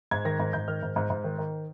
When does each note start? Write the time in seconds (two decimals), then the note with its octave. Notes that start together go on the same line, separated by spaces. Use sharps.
0.11 G#2 G#6
0.25 D#3 A#6
0.40 G#2
0.53 G#2 G6
0.68 D#3 F6
0.83 G#2
0.96 G#2
1.10 G#2
1.24 D#3
1.38 D#3